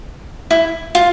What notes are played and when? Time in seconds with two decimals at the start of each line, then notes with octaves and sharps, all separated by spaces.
0.51 E4
0.95 F4